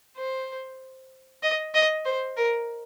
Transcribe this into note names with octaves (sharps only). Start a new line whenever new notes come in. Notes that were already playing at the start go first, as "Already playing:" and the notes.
C5
D#5
D#5
C5
A#4